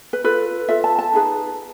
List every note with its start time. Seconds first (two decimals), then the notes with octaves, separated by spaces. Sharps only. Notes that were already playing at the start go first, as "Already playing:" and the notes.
0.13 B4
0.24 F4 A4 B4
0.68 F4 A4 E5
0.84 A5
0.99 A5
1.13 D#4 G#4 B4